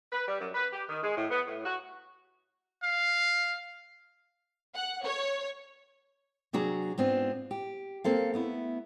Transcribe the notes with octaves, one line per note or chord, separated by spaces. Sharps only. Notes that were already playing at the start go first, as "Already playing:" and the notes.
B4
G3
F#2
B4
G4
D#3
G#3
A2
B3
A2
F#4
F5
F#5
C#5
C3 F#3 D4 F#4 G#4 A#5
G#2 B3 C4 D4 F4
G4
A#3 C4 A4 F5
A3 B3 E4